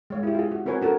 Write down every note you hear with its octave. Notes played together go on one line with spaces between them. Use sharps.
G#3 C#5 F5
E4 G4
F4 G#4
F#4
C4 F#4 A#4 B4 C#5 G#5
D4 F#4 A4 A#4 G#5